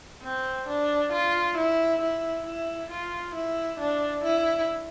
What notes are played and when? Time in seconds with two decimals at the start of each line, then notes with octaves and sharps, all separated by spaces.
0.23 C4
0.67 D4
1.12 F4
1.57 E4
2.01 E4
2.46 E4
2.90 F4
3.35 E4
3.80 D4
4.24 E4